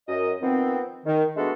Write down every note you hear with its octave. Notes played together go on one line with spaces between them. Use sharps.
F#2 D#5
D#3 F3 B3 C4
D#3
G#3 A3 B3 D4 F#4 A4